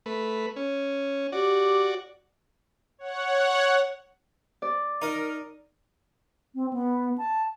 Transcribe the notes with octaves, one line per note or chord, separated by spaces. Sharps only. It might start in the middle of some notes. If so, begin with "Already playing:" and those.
A3 B4
C#4
F#4 G4 D5
C#5 F#5
D5
D#4 A#4 D#5
C4
B3
A5